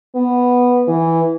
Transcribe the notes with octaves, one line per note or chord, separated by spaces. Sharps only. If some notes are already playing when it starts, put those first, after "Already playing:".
B3
E3